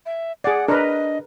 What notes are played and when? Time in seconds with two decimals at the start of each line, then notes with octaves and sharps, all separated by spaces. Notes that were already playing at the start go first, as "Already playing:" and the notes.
0.06 E5
0.44 G#4 D5 F#5
0.68 D4 A#4 B4 D#5